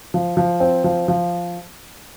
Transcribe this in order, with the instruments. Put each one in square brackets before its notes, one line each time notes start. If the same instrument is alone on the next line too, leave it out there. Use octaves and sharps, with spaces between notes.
[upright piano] F3
F3
C4
F3
F3